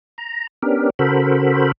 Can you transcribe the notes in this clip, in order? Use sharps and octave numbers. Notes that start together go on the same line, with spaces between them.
A#5
B3 C#4 D4 G4 A#4
C#3 F#4 A4 A#4 C5 B5